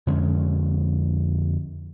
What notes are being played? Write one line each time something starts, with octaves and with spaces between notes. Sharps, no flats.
F2 D3 G#3 C#4